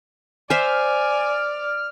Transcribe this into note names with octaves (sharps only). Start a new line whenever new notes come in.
C5 D5 E5 G#5 F6